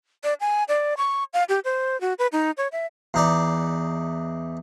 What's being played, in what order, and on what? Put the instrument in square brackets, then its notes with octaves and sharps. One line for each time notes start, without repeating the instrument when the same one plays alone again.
[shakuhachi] D5
G#5
D5
C#6
F5
G4
C5
F#4
B4
D#4
C#5
E5
[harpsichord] E2 D#4 D5